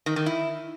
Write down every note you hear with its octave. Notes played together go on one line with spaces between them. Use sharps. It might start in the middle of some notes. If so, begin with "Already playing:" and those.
D#3
D#3
E4